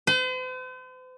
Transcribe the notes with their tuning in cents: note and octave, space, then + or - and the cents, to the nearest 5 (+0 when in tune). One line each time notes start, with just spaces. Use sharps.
C5 -45